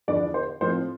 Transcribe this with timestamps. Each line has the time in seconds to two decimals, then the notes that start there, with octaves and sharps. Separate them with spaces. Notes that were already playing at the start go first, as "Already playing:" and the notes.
0.08 E2 D3 F3 B3 D4 D5
0.34 C5
0.61 A2 F3 A3 C4 C5